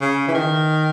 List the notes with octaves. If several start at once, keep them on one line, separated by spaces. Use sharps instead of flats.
C#3
E3
D#3